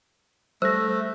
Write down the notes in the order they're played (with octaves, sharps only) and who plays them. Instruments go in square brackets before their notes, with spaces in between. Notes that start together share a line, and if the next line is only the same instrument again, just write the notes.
[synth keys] G3 [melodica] A3 [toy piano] C5 [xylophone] E6 A#6